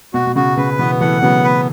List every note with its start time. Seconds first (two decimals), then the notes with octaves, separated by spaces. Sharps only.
0.14 B2 F#4
0.27 B2
0.36 C#3 F#4
0.57 C#3 B4
0.79 B2 E3 B3
1.00 E3 A3 F#5
1.22 C#3 F#3 B3
1.44 B4